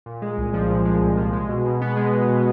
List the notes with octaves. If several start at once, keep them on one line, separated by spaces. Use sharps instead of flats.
A#2
G#3
C2
F3
A#2
G#3
C2
F3
G#3
B2
B2
B3
G#3
B2
B2